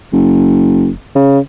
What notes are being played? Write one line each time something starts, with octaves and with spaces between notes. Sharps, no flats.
F#1
C#3